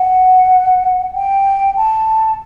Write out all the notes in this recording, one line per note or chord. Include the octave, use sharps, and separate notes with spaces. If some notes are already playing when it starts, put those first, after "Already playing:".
Already playing: F#5
G5
A5